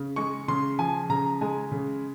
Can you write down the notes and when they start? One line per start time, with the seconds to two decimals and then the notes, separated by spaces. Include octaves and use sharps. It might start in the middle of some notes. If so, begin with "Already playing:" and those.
Already playing: C#3
0.16 G#3 C#6
0.48 C#3 C6
0.79 F3 G#5
1.09 C#3 A#5
1.41 G#3 G#5
1.71 C#3